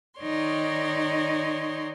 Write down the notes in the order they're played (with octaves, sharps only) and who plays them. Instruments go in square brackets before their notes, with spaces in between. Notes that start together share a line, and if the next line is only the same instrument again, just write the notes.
[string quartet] D#3 D#4 C#5 D5 C6